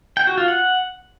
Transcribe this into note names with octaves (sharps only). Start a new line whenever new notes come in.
G5
F#4
F4
F#5